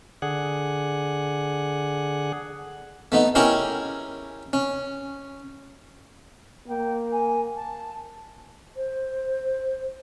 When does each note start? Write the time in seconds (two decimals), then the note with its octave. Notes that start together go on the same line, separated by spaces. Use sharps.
0.22 D3 G#4 F#5
3.12 A3 B3 D#4
3.35 C#4 E4 G4 G#4 A#4 C#5
4.53 C#4
6.68 A#3 G5
7.11 G#5
7.56 A5
8.77 C5